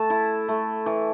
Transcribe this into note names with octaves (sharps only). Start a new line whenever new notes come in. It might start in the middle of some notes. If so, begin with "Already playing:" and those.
Already playing: A3 A5
E4
A3
E3